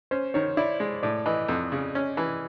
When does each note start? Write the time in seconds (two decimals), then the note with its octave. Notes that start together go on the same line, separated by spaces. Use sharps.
0.11 C#4 C5
0.34 D#3 C#5
0.57 E4 D5
0.80 G#3
1.03 A2 D5
1.26 E3 D#5
1.48 F2
1.72 C#3
1.95 C#4
2.17 E3